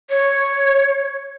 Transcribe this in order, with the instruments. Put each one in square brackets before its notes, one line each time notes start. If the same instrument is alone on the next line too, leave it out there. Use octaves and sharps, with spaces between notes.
[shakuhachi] C#5